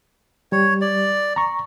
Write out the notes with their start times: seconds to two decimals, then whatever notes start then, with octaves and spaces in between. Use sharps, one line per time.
0.52 G3 C#5
0.81 D5
1.36 A#5 C#6